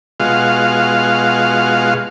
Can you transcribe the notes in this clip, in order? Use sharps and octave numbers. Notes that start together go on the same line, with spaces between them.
B2 G#3 F4 F#4 F5